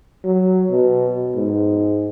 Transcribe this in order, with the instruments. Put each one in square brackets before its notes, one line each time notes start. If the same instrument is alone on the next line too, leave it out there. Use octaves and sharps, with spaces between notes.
[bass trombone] F#3
B2
G#2